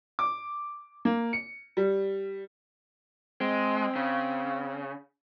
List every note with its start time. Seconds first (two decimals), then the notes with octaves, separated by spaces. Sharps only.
0.19 D6
1.05 A#3
1.33 C#7
1.77 G3
3.41 G#3 C4
3.96 C#3